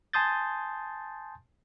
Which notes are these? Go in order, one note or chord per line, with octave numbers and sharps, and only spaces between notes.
G#5 A5 C6 D#6 G6 A6